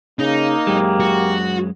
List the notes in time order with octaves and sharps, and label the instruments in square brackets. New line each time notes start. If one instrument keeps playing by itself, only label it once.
[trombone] C#3 [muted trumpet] A#3 [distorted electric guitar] D#4
[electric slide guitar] F#2 G#3 [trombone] G4
[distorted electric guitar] F#4